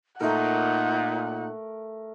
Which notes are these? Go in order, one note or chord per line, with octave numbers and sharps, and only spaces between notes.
A#2 A3 D#4 A#4 F#5